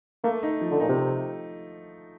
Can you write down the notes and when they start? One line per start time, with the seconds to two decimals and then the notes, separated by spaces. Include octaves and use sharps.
0.24 A3 A#3
0.43 D#4
0.61 F3
0.71 D3
0.80 A#2 D#4
0.89 C3